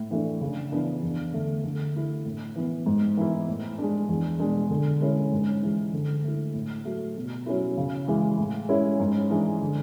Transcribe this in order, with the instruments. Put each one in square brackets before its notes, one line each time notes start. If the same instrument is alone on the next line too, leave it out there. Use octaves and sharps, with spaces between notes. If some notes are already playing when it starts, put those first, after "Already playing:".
Already playing: [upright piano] A2
E3 A3 D4
C#3
E3 B3 D4
E2
D3 A3
D3
A3 E4
A2
E3 B3
G#2
E3 B3 E4
A2
G#3 D4
E2
B2 G#3 D4
D3
G#3 C#4 E4
G#2
E3 G#3
D3
A3 E4
A2
F#3 A3
B2
F#3 C#4 E4
C#3
E3 G#3
A2
G#3 C#4 E4
G#2
E3 G#3 D4
D3